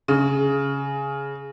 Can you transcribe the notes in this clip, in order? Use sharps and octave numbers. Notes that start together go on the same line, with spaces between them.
C#3